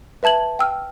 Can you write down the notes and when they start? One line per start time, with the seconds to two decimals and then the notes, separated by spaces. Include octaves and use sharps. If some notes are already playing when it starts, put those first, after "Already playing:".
0.23 B4 E5 A5 G#6 F#7
0.59 G5 E6 F6